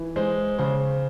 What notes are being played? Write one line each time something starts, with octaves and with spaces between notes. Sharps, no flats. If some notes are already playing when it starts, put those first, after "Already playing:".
Already playing: E3
G#3 C5
C#3 C5